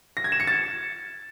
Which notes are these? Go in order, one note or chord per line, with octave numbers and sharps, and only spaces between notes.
A#6
G#6
E7
C#7
A6